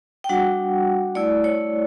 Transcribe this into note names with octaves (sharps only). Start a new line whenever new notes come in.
G5
G3 D4 F#4 F#5
A3 E4 D5
C#5